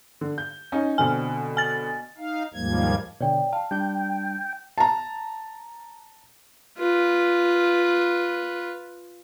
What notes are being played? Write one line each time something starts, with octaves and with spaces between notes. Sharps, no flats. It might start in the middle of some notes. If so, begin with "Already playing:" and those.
D3
G6
C#4 D#4
B2 D3 C4 G#5
G#5 A6
D#4 F5
D#2 G#2 F3 G3 A#3 G#6
B2 D3 C#5 D5 G5
F5 A5
G3 D4 G5 G6
A5 A#5
F4 B4